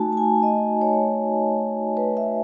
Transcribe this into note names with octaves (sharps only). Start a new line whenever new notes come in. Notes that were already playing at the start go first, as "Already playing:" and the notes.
Already playing: A3 D#4 F#4 G#5 A5
A5
G#5
D#5
C#5
B4
E5